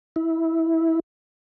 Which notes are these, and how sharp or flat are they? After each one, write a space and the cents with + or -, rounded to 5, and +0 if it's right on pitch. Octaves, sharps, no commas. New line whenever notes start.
E4 -15